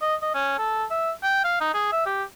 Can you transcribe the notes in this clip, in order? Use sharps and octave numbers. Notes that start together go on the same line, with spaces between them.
D#5
D#5
C#4
A4
E5
G5
F5
D#4
G#4
E5
G4